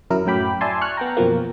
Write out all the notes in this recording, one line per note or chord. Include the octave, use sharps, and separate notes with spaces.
F#2 F#3 E4 A#4
F#2 A2 F#3 G5 B5 D6
D5 E5 G#5 A5 C6
C#6 F6 F#6
B3 G5 A#5
F#2 B2 F3 A#3